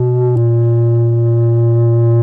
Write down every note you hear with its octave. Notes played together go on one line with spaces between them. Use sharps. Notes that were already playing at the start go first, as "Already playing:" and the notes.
Already playing: B2
A#2